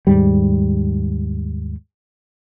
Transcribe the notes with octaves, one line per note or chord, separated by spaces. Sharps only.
D#2 G#2 G3